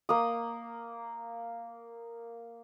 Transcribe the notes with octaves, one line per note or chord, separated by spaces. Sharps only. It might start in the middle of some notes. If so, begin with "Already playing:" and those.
A#3 D#6